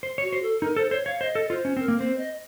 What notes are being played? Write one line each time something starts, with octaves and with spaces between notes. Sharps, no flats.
C5
C#5
F#4
C5
A4
D#4 A#4
A4 C5
C5 C#5
C#5 F5
C5 D#5
A4
F4 C5
C#4
C4 A#4
A#3
C4 C5
D#5